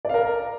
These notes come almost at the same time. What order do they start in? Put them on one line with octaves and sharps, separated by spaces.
D5 F5 A#4